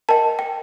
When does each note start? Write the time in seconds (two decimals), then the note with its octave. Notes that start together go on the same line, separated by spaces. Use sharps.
0.09 A#4 D#5 G5 A5
0.39 G5